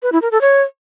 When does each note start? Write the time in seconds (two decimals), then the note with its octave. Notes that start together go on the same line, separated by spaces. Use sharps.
0.03 B4
0.12 E4
0.22 A#4
0.32 A4
0.41 C#5